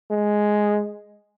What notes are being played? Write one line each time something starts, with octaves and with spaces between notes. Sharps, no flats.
G#3